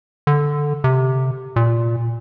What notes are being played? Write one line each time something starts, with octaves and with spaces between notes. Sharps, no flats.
D3
C3
A#2